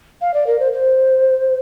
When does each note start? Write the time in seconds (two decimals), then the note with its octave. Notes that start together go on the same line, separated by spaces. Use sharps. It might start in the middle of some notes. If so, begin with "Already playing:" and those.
0.21 F5
0.34 D5
0.47 A#4
0.60 C5
0.72 C5